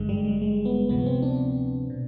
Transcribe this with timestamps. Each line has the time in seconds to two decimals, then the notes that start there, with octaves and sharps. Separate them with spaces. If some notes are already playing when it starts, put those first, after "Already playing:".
Already playing: G#1 G2 D3 G#3
0.09 G3
0.24 G#3
0.42 G#3
0.65 B3
0.89 D2 C3 F3 B3
1.06 C4
1.22 D4
1.90 B2